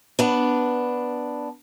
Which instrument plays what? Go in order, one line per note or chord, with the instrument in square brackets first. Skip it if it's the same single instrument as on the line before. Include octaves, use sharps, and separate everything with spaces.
[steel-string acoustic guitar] B3 D4